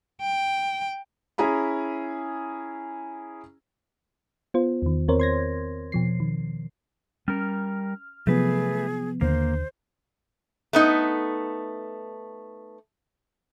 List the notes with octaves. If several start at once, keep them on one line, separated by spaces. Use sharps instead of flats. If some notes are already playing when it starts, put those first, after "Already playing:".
G5
C#4 E4 G#4 A#5 B5
B3 F4 C5
E2 D#3
E2 C4 A#4 C5 C#5
C6 G#6 A#6
B2 F3 C7
D#3
G3 C#4 A#4 F6
C3 F3 F#3 A3 B3 G#4 B4
D#2 D3 A#3 C5
A3 B3 D#4